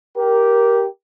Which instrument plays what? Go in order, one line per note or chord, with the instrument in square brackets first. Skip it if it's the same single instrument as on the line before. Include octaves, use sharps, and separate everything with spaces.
[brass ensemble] G4 A#4